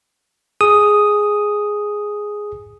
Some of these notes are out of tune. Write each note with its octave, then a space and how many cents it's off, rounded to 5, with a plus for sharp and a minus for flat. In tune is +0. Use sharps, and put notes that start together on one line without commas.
G#4 +0 D#6 +0